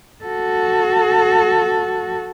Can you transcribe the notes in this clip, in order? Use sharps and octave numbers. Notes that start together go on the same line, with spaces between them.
F#4 A4